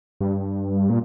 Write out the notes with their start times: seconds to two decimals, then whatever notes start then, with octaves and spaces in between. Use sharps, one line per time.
0.21 G2
0.90 A#2